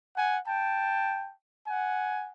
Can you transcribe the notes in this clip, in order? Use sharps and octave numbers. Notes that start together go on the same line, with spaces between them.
F#5 G#5
G5 A5
F#5 G#5